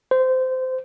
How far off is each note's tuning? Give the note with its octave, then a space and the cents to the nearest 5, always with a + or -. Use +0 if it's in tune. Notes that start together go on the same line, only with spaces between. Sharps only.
C5 -20